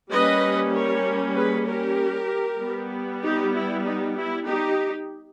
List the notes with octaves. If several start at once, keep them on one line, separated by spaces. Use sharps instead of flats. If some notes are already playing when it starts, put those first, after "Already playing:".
G3 A#3 C#4 B4 D#5
A#4 C#5
G#4 B4
G4 A#4
G3 B3
D#4 G4
E4
D#4
E4
D#4 G4